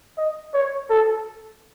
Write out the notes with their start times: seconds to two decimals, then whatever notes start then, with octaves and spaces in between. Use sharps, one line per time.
0.18 D#5
0.54 C#5
0.90 A4